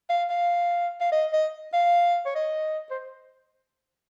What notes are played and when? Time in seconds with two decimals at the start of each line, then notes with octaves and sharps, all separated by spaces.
0.09 F5
0.30 F5
1.00 F5
1.12 D#5
1.33 D#5
1.73 F5
2.25 C#5
2.35 D#5
2.91 C5